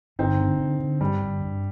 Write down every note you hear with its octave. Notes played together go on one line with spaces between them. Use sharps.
G1 C4 D#4
D3
D3
D3
G2 G3
G1
G2